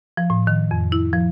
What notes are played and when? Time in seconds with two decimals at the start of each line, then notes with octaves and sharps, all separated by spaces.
0.17 F3
0.30 A2
0.47 D#3
0.71 F2
0.92 E4
1.13 F3